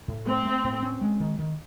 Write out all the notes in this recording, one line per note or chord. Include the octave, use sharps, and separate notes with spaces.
A2
A3 C4
A3
A2
C#4
G#3
D#3
D#3